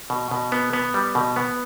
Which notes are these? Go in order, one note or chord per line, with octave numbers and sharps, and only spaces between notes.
B2
B2
B3
B3
G3
B2
B3